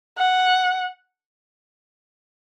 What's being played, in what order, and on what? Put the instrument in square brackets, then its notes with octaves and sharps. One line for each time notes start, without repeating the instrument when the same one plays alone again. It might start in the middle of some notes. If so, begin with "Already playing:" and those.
[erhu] F#5